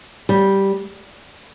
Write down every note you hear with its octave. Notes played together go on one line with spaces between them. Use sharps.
G3